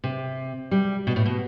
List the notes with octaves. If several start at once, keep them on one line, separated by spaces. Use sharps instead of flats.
C3
G3
B2
A2
B2